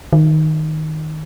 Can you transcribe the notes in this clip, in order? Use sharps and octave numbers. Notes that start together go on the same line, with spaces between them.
D#3